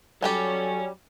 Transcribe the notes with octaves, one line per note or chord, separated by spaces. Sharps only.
F#3 G3 C#4 G4 A4 C#5 G#5